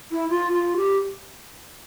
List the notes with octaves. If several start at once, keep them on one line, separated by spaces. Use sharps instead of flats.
E4
F4
F4
G4